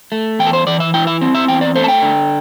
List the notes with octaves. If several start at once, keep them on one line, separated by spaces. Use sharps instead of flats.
A3
E2 G5
A4
C5
E3 D5
E5
E4 G5
E5
C4
E5
E2 G5
D5
A3 C5
A5
G5
D3